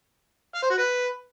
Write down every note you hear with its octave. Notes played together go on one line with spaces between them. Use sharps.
F5
C5
F#4
B4